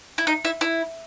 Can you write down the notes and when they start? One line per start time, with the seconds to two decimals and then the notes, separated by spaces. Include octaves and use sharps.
0.18 E4
0.27 D#4
0.45 E4
0.61 E4